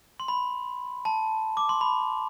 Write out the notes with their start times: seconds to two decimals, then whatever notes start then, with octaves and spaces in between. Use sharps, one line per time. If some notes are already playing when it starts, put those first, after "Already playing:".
0.20 C6
0.28 B5
1.05 A5
1.57 D6
1.69 C6
1.81 B5